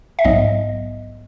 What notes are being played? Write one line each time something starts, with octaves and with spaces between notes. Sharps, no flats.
E5
A#1 G#2 F#3 B3 D#5